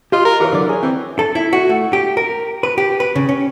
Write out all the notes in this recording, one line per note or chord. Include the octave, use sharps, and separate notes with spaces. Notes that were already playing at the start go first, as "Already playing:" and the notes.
F4 G4 D#5
A#4
E3 G4 A#4 C#5
D3 F#3 D5
G#4 C#5
E3 C4
A4
E4
F#4
A3
G4
A#4
B4
G4
B4
C#3
C#4